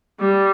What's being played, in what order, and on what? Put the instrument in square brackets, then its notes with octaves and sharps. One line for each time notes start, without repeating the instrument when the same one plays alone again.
[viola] G3